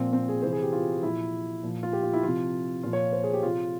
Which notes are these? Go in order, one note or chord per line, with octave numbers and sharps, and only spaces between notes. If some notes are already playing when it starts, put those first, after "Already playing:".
Already playing: A#2 F3 C4
C4
G#4
C3 E3 C5
G#4
G4
F4
A#2 F3 E4
A#2 F3
F4
G4
F4
E4
C3 F3 F4
A#2 F3 F4
C#5
C5
G#4
G4
C3 F3 F4